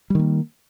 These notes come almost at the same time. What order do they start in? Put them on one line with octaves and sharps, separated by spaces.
G3 D#3 A#3